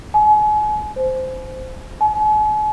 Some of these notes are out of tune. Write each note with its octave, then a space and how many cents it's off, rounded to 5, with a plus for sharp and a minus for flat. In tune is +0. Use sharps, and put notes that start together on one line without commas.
G#5 +35
C5 -10
G#5 +45